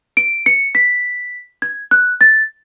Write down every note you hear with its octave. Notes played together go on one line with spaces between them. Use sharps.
D7
C#7
B6
G#6
F#6
A6